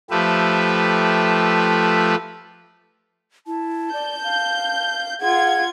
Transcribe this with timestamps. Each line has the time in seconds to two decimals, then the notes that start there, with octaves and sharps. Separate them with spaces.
0.10 F3 A3 G4 B4 E5
3.47 E4 A5
3.93 D5 G6
4.24 F5
5.20 F4 G#4 F#5 G#6